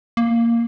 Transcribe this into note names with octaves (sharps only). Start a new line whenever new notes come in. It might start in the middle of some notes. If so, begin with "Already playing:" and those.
A#3